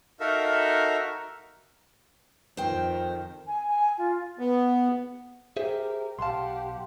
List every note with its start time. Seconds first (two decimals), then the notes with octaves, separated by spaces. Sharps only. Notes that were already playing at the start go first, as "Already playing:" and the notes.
0.20 D#4 F#4 A4 A#4 E5 F5
2.57 F2 D#3 C5 G5
3.47 G#5
3.68 G#5
3.98 F4
4.39 B3
5.57 G4 G#4 A#4 C5 E5
6.19 B1 G4 F5 F#5 A5 C6